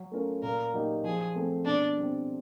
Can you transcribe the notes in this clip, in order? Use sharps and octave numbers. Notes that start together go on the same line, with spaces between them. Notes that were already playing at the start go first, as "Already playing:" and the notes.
Already playing: F#3
A3 C#4 F4 A#4
A#2 A#4
F#3 A#3 D#4 G4
F3 G#4
A3 C4
B2 D4
G3 C4